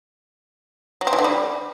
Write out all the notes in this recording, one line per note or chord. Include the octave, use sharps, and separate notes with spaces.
F#3
C4
E3
D3
G3